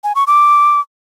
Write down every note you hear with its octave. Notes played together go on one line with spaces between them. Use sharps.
G#5
C#6
D6